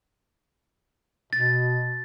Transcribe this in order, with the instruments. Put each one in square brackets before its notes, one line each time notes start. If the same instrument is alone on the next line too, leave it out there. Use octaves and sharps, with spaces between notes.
[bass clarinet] B2 [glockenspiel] A6